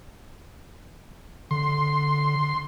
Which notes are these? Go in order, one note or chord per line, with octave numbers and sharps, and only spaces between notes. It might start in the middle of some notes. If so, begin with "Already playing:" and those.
D3 C6